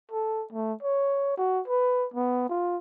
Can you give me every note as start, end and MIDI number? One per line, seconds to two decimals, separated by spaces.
0.12 0.45 69
0.53 0.73 57
0.83 1.36 73
1.37 1.61 66
1.68 2.06 71
2.14 2.48 59
2.49 2.77 65